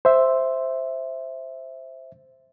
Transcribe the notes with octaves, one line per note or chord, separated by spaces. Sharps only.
C5 E5